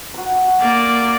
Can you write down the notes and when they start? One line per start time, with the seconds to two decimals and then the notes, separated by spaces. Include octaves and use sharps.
0.14 F#4 B5
0.61 A#3 D5